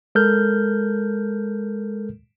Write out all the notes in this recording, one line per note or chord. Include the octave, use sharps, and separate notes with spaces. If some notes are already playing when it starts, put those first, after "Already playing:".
G#3 A4 A#4 F6 G6